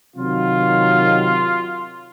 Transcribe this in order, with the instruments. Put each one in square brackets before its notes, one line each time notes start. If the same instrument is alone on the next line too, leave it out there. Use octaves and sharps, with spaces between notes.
[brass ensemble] C3 D#3 F#3 F4